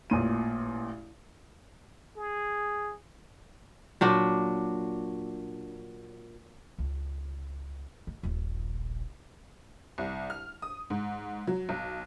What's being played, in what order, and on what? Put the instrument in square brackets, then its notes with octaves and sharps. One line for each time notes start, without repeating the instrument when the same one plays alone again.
[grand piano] A1 A#2 D#7
[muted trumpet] G#4
[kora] A#2 F#3 D4
[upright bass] C#2
G#3
D#1 A#1
[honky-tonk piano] C2
F6
D#6
G#2
F#3
B1